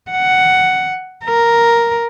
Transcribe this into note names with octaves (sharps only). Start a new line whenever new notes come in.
F#5
A#4